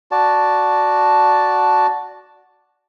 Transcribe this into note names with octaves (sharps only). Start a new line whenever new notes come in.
F#4 D5 A5